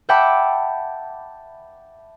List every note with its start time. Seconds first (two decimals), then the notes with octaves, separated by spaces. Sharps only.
0.09 E5 F#5 G5 A5 B5 D6